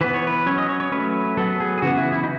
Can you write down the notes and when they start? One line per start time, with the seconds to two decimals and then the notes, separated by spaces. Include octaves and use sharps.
0.01 E3 B3 B4
0.14 C#5
0.27 B4
0.46 F#3 C#4 C#5
0.58 D#5
0.69 C#5
0.80 C#5
0.92 F#3 A3 C#4 B4
1.37 F#3 B3 A4
1.60 G#4
1.78 G#4
1.82 C#3 E3 B3 F#4
1.97 E4
2.12 E4
2.24 D#4